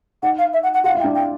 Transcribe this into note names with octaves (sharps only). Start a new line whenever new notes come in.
D#4 F#5
F5
E5
F#5
F#5
F4 F#5
E4
G5
D4
G5